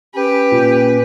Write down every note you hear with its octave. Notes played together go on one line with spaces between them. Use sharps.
C#4 G4 B4
A#2